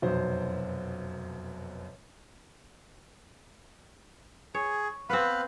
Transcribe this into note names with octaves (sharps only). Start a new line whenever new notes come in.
F1 F#2 B2 C5
G#4 C#5
B3 C4 B4 F5 B5